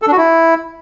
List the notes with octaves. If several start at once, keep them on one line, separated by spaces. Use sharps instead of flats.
A4
D4
F#4
E4